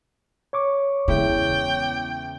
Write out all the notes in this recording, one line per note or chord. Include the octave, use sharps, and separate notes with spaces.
C#5 C#6 D6
E2 C#3 G#3 E4 G5